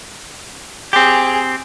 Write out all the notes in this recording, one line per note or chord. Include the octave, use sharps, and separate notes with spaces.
C4 G4 G#4